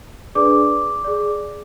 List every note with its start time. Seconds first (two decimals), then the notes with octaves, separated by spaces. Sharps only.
0.35 D4 G#4 B4 D5 D6
1.04 G#4 D5